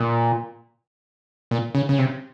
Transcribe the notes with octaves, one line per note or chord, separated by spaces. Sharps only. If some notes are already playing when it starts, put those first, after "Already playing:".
Already playing: A#2
A#2
C#3
C#3
C3